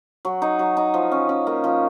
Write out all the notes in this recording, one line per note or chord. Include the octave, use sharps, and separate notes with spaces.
F#3
D#4
F#3
D#4
F3
C#4
C#4
A#3
F3